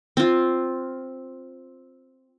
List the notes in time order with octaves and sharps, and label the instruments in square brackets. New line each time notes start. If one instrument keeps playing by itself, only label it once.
[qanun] C4 F4